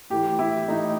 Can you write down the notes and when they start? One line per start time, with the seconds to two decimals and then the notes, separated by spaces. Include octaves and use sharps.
0.10 A2 E3 G4
0.39 E4
0.68 A2 E3 D#4